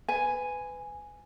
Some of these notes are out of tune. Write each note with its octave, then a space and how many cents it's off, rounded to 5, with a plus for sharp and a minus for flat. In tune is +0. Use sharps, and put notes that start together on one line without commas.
B4 +25 G#5 +0